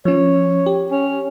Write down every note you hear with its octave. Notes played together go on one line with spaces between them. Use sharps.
F3 C#4 C#5
G4
C#4